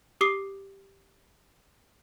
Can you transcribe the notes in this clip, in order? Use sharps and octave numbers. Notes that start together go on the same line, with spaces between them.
G4 D6 D#6 C7 G7